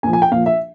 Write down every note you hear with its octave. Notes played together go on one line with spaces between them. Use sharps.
A#2 F3 G#5
G#5
G5
A#2 F3 F5
E5